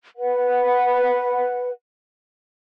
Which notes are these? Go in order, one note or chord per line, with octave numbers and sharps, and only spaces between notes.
B4 F#5